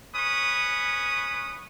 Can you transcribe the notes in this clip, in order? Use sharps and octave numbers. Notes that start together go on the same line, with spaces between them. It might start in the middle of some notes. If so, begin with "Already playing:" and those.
C#4 B4 C#6 D#6